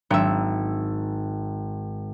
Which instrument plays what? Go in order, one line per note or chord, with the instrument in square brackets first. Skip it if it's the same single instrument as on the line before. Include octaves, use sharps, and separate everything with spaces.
[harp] G#1 E5 [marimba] D#3 F#3 D4